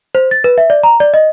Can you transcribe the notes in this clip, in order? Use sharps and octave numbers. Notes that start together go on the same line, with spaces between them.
C5
A6
B4
E5
D5
A#5
D5
D#5